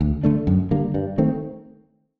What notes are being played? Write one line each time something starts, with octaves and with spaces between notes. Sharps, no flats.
D2
D3 A3 D4
F#2
D3 G3 A#3
G2
D#3 A3 C4